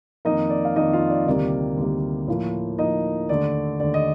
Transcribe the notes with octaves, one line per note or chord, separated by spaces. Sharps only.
F2 D#3 A#3 D#4 D#5
D5
F5
F2 D#3 A#3 D#4 D#5
F4 F5
D5
D2 C3 D#3 G3 A#3 D5
D2 C3 D#3 G3 A#3
A2 F3 A#3
A2 F3 A#3 D#4 D#5
D#2 D3 A3 D5
D#2 D3 A3 D5
D#5